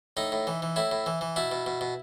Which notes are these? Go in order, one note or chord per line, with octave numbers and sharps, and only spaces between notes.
A2 D#4
A2
E3
E3
A2 E4
A2
E3
E3
B2 E4
B2
B2
B2